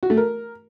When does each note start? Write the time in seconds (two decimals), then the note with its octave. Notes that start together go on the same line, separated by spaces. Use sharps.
0.03 F#4
0.10 A3
0.17 A#4